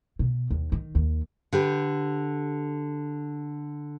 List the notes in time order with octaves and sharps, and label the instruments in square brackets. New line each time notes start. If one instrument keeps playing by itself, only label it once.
[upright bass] B2
D#2
D#3
D#2
[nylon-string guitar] D3 G4 B4